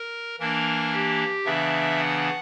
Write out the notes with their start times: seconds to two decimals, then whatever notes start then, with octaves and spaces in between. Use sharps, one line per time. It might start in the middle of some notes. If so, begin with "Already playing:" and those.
Already playing: A#4
0.39 E3 A#3 D4 A#4
0.93 G4
1.45 C#3 E3 B3 D4 E5
1.98 F#5